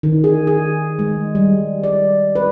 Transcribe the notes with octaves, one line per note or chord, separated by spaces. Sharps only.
D#3
G#4
G#4
G#3
G3
D5
B4